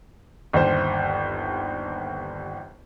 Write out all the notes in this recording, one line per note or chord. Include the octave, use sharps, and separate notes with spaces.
G1 D#2 C5